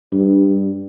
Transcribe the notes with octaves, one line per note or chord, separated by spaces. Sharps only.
G2